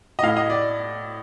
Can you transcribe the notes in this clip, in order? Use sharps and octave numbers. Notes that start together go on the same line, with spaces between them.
D#5
A2 F5
D#5
D5